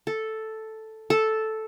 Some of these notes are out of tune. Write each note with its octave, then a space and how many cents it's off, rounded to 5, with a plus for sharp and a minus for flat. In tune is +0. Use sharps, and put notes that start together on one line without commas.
A4 +0
A4 -5